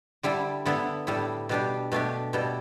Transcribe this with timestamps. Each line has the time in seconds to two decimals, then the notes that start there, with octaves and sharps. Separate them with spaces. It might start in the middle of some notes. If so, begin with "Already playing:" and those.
0.23 D3 G3 E4 A4
0.66 D3 B3 E4 A4
1.07 A2 G3 E4 A4
1.49 B2 G3 D4 G4
1.92 B2 A3 D4 G4
2.33 B2 G3 E4 A4